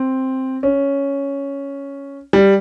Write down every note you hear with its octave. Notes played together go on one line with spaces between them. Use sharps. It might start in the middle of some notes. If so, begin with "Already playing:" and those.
Already playing: C4
C#4
G3